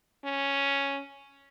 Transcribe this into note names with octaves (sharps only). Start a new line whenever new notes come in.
C#4